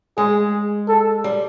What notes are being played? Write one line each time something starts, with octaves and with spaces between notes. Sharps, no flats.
G#3 G#4
A4
G3